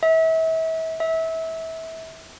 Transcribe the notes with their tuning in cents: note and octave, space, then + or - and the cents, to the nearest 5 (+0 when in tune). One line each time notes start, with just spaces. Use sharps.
E5 -35
E5 -25